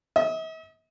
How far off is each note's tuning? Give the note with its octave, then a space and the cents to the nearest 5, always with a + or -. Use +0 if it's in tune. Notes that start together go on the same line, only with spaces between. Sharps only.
E5 -45 D#6 +0